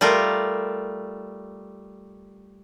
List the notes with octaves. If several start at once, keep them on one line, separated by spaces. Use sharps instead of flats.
G3 A3 F4 A#4